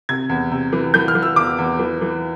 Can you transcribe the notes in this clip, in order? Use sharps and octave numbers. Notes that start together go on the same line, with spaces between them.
C3 G#6
E2
C3
E3
E3 G6
F6
E3
E6
E2 D6
E2
E3
E3